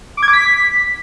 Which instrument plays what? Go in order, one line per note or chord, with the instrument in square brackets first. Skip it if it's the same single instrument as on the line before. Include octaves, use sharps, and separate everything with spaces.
[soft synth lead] D6
G#6
D6
B6